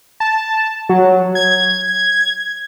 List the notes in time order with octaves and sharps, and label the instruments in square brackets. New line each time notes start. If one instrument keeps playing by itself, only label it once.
[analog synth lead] A5
F#3
G#6